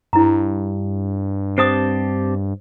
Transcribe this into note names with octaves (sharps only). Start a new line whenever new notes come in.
G2 E4 A#5
C4 G4 C5 A5 D#6